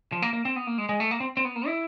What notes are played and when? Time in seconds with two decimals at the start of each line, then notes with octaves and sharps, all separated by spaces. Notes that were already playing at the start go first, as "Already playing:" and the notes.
0.12 F3
0.22 A#3
0.33 A#3
0.45 C4
0.56 B3
0.67 A#3
0.78 G#3
0.89 G#3
1.00 A3
1.11 A#3
1.20 C4
1.37 C4
1.45 B3
1.56 A#3
1.67 E4